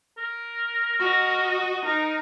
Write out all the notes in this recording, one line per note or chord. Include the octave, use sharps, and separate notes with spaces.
A#4
F#4 D#5
D#4 A#4